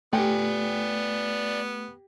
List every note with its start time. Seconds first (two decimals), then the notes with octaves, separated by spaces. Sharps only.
0.13 A3 B3 G4 D5 G5 G#5